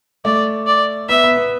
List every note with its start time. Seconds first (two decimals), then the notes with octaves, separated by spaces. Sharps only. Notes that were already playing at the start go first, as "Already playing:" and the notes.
0.25 A3 D5
0.67 D5
1.09 B3 E5
1.24 B3
1.36 B3